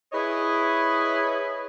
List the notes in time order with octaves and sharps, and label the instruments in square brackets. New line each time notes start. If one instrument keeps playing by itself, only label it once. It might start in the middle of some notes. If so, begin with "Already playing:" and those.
[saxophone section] E4 G#4 B4 C#5 D#5